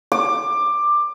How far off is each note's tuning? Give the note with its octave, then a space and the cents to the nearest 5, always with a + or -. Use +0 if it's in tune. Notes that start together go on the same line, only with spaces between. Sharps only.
D6 +15